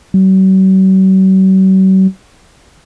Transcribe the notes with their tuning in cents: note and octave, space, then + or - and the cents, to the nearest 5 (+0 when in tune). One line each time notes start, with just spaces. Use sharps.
F#3 +45